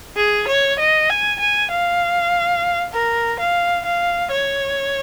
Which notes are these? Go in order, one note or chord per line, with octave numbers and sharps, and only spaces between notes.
G#4
C#5
D#5
G#5
G#5
F5
A#4
F5
F5
C#5